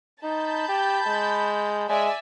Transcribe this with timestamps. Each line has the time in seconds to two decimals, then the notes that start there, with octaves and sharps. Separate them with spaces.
0.23 D#4 A5 B5 G6
0.69 G4
1.07 G#3
1.89 G#3 D5 E5 G#5